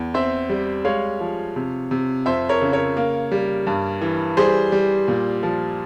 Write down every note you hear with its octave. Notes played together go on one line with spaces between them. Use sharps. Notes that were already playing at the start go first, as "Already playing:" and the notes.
Already playing: E2
C4 C5 E5
G3
G#3 C#5 F5
F3
C3
C3
F2 C5 E5
A#4 C#5
C#3
A#4 C#5
A#3
G3
G2
E3
G3 G#4 C5
G3
A#2
F3